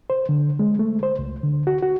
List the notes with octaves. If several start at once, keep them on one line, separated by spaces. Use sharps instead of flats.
C5
D3
G#3
A3
C5
C#2
D3
F#4
F#4